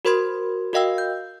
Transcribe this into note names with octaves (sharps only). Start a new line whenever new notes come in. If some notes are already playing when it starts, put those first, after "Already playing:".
F#4 A#4 C5 B5 C6 G#6
F#4 A#4 D#5 F5 G5 E6
G6